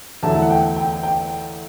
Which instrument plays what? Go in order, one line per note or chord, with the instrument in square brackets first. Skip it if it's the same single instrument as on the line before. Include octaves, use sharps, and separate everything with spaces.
[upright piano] E2 D3 F#3 A3 E4 [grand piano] A5
[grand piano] F#5
G5
G5
G5